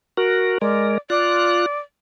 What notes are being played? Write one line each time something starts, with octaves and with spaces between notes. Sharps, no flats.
F#4 A#4
G#3 A#4 D5
F4 D5 F#6